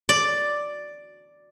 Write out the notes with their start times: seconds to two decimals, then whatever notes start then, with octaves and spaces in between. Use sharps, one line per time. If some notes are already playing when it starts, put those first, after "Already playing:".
0.09 D5